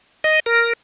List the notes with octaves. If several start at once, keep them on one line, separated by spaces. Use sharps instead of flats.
D#5
A#4